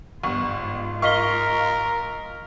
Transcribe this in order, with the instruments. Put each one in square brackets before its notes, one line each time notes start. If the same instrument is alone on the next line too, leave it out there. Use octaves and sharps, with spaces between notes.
[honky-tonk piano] G1 [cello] G#2 F4 [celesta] C#6
[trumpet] A#4 [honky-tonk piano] D#5 F5 C#6 [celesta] F6 B6 G7